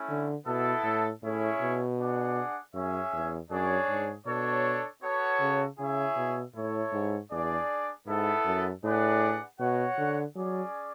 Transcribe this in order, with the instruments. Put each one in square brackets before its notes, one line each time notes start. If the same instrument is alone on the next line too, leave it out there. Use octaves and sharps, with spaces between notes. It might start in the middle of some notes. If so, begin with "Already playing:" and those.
Already playing: [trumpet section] A3 C#4 E4
[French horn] D3
[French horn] B2 [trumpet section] B3 E4 A4
[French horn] A2
[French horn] A2 [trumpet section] C#4 E4 G#4 C#5
[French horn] B2
[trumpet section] D4 G#4 D5 F#5
[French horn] F#2 [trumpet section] C#4 G#4 C#5 E5
[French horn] E2
[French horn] F#2 [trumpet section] D4 G#4 C#5
[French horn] G#2
[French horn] B2 [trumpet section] D4 A4 C#5
[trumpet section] B3 F#4 A4 C#5
[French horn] C#3
[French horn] C#3 [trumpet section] E4 G#4 C#5 E5
[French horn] B2
[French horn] A2 [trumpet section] E4 A4 C#5
[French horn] G#2
[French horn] E2 [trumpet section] D4 G#4 D5
[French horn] G#2 [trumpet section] B3 E4 A4
[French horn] F#2
[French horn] A2 [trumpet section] D4 G#4 B4 D5 F#5
[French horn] B2 [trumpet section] F#4 C#5 F#5
[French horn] D3
[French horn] F#3 [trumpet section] C#4 G#4 D5